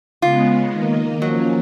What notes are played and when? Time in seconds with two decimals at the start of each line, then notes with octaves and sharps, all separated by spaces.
0.22 C#3 G#3 B3 F4
0.72 D#3 A#3 D#4
1.22 F3 F#3 A#3 C#4